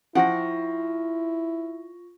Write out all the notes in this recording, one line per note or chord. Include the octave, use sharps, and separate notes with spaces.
F3 E4 F4 F#5 G5 C#6 A#6